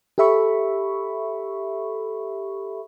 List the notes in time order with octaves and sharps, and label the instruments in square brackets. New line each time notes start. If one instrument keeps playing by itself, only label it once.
[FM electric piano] G4 A4 E5 B5 C#6